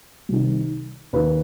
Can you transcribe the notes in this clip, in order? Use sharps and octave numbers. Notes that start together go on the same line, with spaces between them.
C2 C3 D#3
D#2 D#3 B4